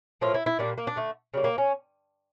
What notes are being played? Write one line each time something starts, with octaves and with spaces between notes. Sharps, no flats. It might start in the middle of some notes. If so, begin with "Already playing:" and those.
A2 F3 A#3 F4
E4
E4
A#2 G3 A#3 D4
A#3
D4
D3 A3
C#3 G3 A#3
A#3
C#4